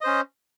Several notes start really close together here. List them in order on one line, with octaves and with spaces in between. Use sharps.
D#5 C5 C#4